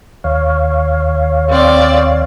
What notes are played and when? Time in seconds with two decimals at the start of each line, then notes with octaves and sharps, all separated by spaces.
0.24 D#2 C#5 F5
1.49 C4 D5